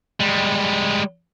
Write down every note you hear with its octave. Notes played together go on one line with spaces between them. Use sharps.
G3 G#3